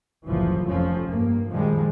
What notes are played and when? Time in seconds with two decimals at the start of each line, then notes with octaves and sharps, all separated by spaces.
0.25 F#1 C2 F#2 A2 E3 F3
0.67 F1 F2 F3 C#4
1.06 G2 A#3
1.48 F#2 A#2 D#3 F3 G3 G#3